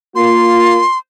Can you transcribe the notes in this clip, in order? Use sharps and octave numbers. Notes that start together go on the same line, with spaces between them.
A#3 F4 C6